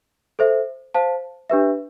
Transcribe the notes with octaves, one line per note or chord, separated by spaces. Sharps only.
A4 C5 E5
C5 F5 A5
D4 G4 B4 E5